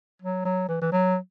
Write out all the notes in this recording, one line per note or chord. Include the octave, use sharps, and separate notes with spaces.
F#3
F#3
E3
E3
F#3